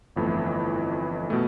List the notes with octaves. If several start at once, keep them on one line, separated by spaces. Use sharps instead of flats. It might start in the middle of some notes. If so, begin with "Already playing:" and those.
G1 F2 E3 A3 E4
B2 A3